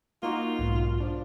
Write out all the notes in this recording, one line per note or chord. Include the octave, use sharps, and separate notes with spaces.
A#3 D#4 F4 F#4
B1 G#2
F3 D4